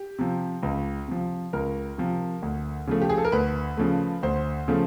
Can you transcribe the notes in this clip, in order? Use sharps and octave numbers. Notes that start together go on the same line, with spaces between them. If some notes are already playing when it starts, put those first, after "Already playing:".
Already playing: G4
C3 F3
C#2
C3 F3
C#2 A#4
C3 F3
D2
C#3 F3 A3
G4
G#4
A4
A#4
D2 B4
C#3 F3 A3
D2 C5
C#3 F3 A3